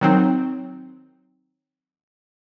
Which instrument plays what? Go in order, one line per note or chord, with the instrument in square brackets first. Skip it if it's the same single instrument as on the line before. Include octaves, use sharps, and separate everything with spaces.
[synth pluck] D#3 F#3 C4 D#4